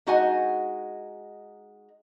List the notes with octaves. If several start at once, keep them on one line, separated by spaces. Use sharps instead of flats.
G#3 D#4 F#4 D#5 F#5 G#5